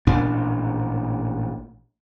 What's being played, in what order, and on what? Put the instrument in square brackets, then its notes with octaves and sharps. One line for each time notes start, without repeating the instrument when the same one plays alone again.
[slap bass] A1 A#2 D4